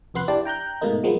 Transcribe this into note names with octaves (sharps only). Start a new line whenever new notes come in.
C2 F2 B3 C6 F#6
D4 E4 G4 D5 A5
G5 A#5 F#6 G6
G#2 B2 A3 A#3 D#4
F3 F#3 G#3 A#3 B3